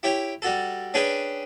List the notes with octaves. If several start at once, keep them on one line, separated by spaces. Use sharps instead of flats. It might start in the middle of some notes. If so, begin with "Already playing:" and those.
E4 G4 C#5 G5
G3 F#4 A4
C#4 D4 G#4 B4 G5 G#5